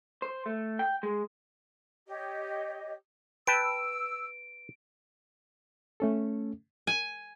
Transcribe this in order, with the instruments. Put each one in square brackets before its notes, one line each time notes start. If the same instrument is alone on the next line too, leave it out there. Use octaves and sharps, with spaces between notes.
[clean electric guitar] C5
A3
G5
G#3
[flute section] G4 C#5 D#5
[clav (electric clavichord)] B4 G5 A5 [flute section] E6 [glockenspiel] D7
[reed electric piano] A3 C#4 A4
[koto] G#5